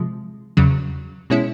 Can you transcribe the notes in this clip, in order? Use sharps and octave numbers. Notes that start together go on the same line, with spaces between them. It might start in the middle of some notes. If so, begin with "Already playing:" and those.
Already playing: C3 F3 G#3
E2 C#3 F#3
B2 G#3 C#4 E4